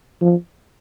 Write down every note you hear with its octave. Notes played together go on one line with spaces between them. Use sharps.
F3